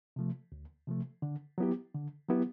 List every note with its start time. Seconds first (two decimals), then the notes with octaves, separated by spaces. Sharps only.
0.16 C3 F3 A3
0.52 D2
0.87 C3 F3 A3
1.22 D3
1.58 F#3 B3 E4 G4
1.94 D3
2.29 F#3 B3 E4 G4